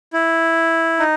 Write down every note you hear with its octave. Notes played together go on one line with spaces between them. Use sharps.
E4
D#4